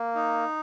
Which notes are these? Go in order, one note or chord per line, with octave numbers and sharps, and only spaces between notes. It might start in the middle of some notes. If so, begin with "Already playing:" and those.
Already playing: A#3
D#4